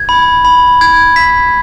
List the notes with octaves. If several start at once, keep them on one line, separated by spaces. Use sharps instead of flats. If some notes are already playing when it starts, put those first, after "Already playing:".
Already playing: G#6
B5
B5
G#6
B6